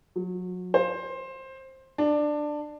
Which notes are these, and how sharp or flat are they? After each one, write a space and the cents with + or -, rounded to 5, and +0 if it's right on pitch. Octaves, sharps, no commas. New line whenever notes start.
F#3 -30
C5 +15
D4 +15